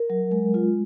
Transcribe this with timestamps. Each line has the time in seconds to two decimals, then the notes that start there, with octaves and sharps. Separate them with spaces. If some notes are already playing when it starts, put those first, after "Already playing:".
Already playing: A#4
0.10 F#3
0.31 G#3
0.54 F4